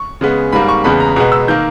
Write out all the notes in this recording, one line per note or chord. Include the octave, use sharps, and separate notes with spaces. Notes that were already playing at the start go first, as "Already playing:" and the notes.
Already playing: C#6
C#3 G#3 B3
G#2 G3 A#3 B5
C#6
E2 C#3 G#3 B3 B5
A#5
B2 G#3 B3 A#5
E6
D#3 A#3 G6